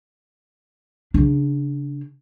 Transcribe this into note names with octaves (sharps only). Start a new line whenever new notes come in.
C#3 D4